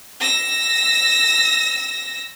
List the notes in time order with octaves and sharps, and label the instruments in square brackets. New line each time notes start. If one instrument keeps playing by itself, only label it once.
[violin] E6 A#6